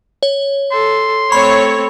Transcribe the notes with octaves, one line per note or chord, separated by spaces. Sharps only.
C#5
A4 C6
A3 C4 C#5 B5